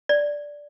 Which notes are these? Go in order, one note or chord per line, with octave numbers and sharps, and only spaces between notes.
D5